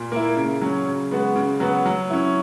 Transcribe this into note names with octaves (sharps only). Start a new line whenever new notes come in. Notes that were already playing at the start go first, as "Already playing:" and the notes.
Already playing: A#2
A#3 E4
C#3
F#3 C#4
C#3
G#3 B3 F#4
C#3
F#3 B3 F#4
F#3
C#4 E4